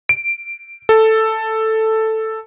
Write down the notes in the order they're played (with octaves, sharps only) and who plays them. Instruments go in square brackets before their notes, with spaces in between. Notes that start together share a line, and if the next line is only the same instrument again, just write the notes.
[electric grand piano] D7
A4